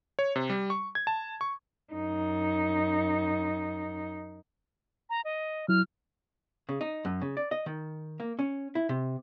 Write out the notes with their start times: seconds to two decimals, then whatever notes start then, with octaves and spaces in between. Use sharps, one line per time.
0.19 C#5
0.36 C3
0.50 G3
0.70 C#6
0.95 G#6
1.07 A5
1.41 C#6
1.93 F#2 D#4
5.10 A#5
5.25 D#5
5.68 F#3 E4 F6
6.69 C#3
6.81 D#4
7.05 F#2
7.21 C#3
7.37 D5
7.51 D#5
7.66 D#3
8.20 A#3
8.39 C#4
8.75 E4
8.89 C3